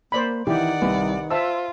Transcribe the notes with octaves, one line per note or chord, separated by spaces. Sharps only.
A#3 C5 D5 B5
D#3 E3 G4 D5 F#5
C2 B4
F4 C5 E5 A5 E6